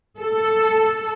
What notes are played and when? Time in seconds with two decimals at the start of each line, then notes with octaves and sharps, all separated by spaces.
0.18 A4